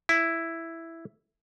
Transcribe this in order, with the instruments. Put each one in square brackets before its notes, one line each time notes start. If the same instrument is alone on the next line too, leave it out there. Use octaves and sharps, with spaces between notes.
[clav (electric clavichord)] E4